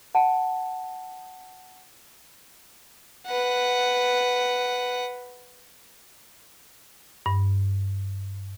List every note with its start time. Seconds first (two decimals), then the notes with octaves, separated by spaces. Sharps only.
0.15 F#5 A5
3.27 B4 F#5
7.26 G2